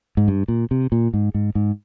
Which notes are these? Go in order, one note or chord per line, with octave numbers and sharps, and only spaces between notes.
G#2
G2
A#2
C3
A#2
G#2
G#2
G#2